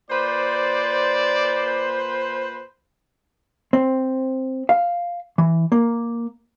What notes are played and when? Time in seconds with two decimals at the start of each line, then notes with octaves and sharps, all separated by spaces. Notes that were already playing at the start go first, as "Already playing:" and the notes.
0.11 A#2 B4 C5 D5
3.73 C4
4.69 F5
5.38 E3
5.72 A#3